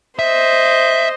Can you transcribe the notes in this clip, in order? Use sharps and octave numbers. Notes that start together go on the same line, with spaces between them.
C5 D#5 E5